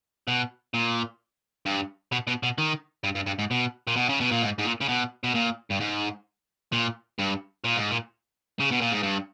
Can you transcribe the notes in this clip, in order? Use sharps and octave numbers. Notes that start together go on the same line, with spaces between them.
B2
A#2
G2
B2
B2
B2
D#3
G2
G2
G2
G#2
B2
A#2
B2
C#3
B2
A#2
G#2
G#2
A#2
C#3
B2
B2
A#2
G2
G#2
A#2
G2
A#2
G#2
A#2
C#3
B2
A#2
G#2
G2